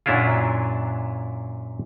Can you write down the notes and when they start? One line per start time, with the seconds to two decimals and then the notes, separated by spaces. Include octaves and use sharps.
0.06 F#2 A#2 F#3 D4 E4 F4